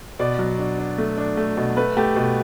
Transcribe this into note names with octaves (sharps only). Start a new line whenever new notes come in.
B2 D5
F#3
D4
D4
A3
D4
A3
B2
A3 B4
A3 G4
B2